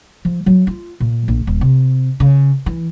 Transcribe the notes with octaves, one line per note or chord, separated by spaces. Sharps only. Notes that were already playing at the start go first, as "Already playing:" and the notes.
F3
F#3
F4
A#2
A#1
D#1
C3
C#3
E3